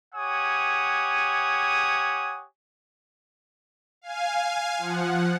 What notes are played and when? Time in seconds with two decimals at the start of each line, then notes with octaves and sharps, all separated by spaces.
0.15 G4 C#5 F#5 G#5 D#6
4.02 F5 G#5
4.78 F3 F#5